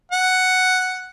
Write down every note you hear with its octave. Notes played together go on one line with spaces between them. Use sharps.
F#5